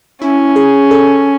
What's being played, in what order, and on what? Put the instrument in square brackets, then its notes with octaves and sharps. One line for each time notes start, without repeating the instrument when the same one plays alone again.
[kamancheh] C#4 [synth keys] E4
[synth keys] G#4
A4